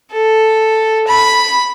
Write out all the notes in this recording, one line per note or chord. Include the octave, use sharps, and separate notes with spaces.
A4
B5